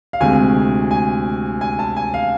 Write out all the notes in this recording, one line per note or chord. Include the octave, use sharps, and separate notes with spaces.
F5
D2 C3 G#3 G#5
G#5
G#5
A5
G#5
F5